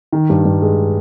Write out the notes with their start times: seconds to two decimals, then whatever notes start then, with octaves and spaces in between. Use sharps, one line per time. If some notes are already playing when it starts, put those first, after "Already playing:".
0.13 D#3
0.30 G2
0.45 G2
0.62 G#3